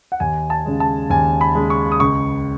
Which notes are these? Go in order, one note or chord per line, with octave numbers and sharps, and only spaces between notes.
F#5
D#2 G#5
A5
C#3 G#3
A5
D#2 G#5
B5
C#3 G#3
C#6
D#6
C#2 C#6